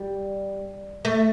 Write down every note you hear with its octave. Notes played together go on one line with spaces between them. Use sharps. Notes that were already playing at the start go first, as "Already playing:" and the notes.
Already playing: G3
A3